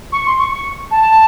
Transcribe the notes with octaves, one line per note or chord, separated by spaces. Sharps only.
C#6
C6
C#6
C#6
A5